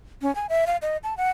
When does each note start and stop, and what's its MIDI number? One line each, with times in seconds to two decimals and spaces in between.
0.22 0.33 61
0.35 0.47 80
0.49 0.65 76
0.67 0.77 77
0.82 0.97 75
1.04 1.16 81
1.17 1.30 78